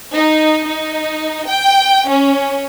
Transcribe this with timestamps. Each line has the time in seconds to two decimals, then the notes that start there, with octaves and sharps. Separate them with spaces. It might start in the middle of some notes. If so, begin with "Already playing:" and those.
0.13 D#4
0.66 D#4
1.47 G5
2.06 C#4